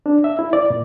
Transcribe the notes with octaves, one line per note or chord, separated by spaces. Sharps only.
D4
E5
E4
D5
A#2